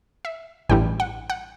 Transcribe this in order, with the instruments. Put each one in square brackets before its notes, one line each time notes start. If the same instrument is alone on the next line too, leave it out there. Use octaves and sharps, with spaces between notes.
[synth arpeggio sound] E5
A1 G2 E3 G3 G5
F#5
F#5